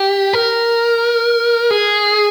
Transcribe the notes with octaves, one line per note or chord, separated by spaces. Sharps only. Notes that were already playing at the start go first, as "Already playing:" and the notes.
Already playing: G4
A#4
G#4